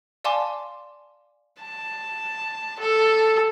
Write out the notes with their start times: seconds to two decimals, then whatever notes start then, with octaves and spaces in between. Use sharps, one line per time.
0.24 D5 F5 G#5 A5 C6 D6
1.61 A5
2.80 A4